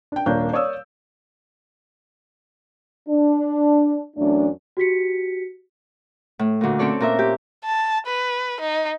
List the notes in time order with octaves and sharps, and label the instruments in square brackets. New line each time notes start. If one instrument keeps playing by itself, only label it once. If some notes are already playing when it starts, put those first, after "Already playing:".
[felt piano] D4 G5
D#1 A#3 D4 C#5 G6
C#5 D5 F5 D#6 E6
[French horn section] D4
F#2 E3 A3 D4
[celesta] F#4 G4 B6 C#7
[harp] A2
D2 A#2
C4 C#4 A4 C#5 D5
A#2 A#4 E5
G4
[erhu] A5
B4
D#4